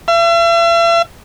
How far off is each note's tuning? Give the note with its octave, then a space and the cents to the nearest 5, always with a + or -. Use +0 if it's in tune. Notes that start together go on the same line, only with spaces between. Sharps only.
E5 +45